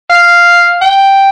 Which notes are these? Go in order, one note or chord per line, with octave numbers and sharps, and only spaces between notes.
F5
G5